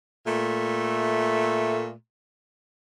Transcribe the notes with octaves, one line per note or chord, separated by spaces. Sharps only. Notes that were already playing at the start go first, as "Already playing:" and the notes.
A#2 A3